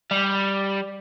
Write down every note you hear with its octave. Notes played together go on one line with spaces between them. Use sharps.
G3